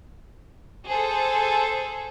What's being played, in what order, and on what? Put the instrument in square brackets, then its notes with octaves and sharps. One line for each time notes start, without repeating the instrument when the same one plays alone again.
[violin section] G#4 A4 C5